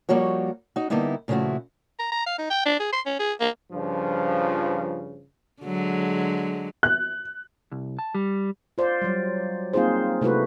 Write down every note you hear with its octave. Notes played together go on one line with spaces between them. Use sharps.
F3 G3 A#3 F#4 C#5
D#4 F#4
D3 G3 A#3 B3 D#4 E4
A#2 C#3 F3 A3 E4 F#4
A#5
A#5
F5
D#4
G5
D4
G#4
C6
C#4
G#4
A#3
G2 C#3 F3
D3 F#3 G#3
F#6
C2
A5
G3
F4 C5 D5
F#3 G3
A#3 C4 D#4 F4 G#4 C5
C3 A3 E4 F#4 B4